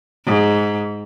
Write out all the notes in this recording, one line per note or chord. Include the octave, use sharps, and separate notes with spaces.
G#2